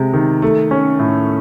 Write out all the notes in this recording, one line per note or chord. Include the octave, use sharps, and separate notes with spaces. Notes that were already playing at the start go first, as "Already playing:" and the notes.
Already playing: C3 G#3
D#3
A3
C#4
A2